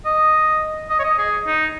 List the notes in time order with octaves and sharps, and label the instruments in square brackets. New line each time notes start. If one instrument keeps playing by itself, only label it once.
[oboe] D#5
D#5
C#5
D#5
G#4
D#4